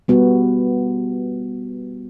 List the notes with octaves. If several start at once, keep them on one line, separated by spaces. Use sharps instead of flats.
G3 B3 F#4